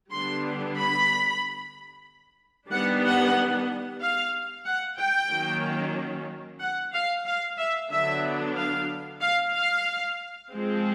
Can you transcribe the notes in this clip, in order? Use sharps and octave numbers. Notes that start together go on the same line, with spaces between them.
D3 G3 B3 D4 C6
B5
D#3 G3 B3 D4 F#5
F#5
F5
F#5
G5
D#3 F#3 A#3 C#4
F#5
F5
F5
E5
D3 F#3 B3 D4 E5
F5
F5
F5
F3 G#3 C4